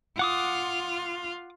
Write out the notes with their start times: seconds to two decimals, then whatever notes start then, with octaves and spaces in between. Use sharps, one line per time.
0.19 F4 F#5 D6 D#6